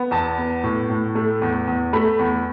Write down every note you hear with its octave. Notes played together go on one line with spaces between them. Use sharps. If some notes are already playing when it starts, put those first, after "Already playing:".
Already playing: B3
E2 A5
B3
A2
A2
A3
E2
E2
A3 B5
E2